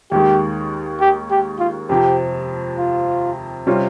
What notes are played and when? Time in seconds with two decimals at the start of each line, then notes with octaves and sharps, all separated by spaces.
0.11 D#2 D#3 G#3 G4
1.01 G4
1.31 G4
1.59 F4
1.89 F2 C3 F3 G4
2.78 F4
3.67 C3 G3 C#4 F4